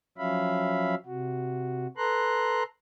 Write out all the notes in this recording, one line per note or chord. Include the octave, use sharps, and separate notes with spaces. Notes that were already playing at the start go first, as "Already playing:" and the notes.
F3 F#3 C#4 E5 F5 B5
C3 F#4
A4 B4 A#5 C6 F#6